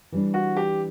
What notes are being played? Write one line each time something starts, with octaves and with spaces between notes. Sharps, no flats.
E3 G3 D4
F#4
G4